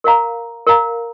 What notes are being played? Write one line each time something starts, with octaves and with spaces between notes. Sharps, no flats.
A#4 F5 A#5
A#4 F5 A#5